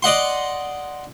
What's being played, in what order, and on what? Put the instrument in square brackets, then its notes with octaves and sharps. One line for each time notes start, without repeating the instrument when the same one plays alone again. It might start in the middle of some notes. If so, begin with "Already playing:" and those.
[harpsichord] D5 D#5 F#5 C6